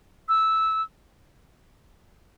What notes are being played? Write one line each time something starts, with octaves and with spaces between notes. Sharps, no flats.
E6